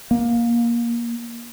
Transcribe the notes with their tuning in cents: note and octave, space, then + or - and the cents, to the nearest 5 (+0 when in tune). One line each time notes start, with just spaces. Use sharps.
A#3 +15